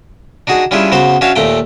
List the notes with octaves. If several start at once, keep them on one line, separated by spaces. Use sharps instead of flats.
D4 D#4 F#4 G#4
G3 C#4 D4 E4 F4 G#4
C#3 B3 F#4 C5
C#4 D4 F#4 C#5 E5 F5
D#2 A#2 A3 G5